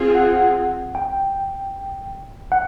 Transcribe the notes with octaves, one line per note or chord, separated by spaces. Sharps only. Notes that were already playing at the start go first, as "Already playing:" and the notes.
Already playing: C4 F4 G#4
F#5
G5
F#5